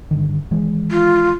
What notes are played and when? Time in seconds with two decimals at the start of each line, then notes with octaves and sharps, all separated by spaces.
0.11 G2 D3 D#3
0.51 D#3 E3 G#3
0.91 F4